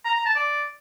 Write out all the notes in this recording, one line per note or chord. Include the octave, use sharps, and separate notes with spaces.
A#5
A#5
A5
D5